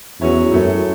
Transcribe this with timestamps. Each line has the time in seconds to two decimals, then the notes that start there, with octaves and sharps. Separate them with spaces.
0.21 E2 F#3 C#4 F#4 C#5 E5
0.51 F#2 A2 F#3 A3 C#4